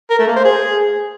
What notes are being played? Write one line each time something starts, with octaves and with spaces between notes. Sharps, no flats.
A#4
A3
A#3
C5
G#4